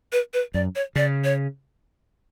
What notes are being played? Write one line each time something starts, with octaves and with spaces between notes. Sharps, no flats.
B4
B4
F#2 D5
C#5
C#3 D5
C#5